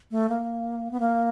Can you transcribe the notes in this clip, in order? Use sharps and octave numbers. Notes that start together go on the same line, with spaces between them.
A3
A#3
B3
A#3